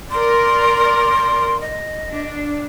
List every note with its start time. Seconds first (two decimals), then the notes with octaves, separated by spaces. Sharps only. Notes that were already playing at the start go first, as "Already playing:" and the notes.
0.11 A#4 D5 C6
1.61 D#5
2.11 D4